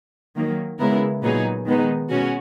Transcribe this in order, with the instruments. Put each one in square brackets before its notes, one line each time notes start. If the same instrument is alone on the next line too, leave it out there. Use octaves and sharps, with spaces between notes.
[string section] D#3 F#3 A#3
C#3 G#3 B3 E4 A#4
A#2 F#3 B3 D#4 G#4
D#3 G#3 B3 D#4
B2 G#3 C#4 F#4